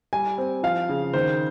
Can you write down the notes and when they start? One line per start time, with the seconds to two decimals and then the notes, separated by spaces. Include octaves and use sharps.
0.13 G3 G#5
0.38 C4
0.63 F3 F5
0.89 C#3
1.13 D#3 C5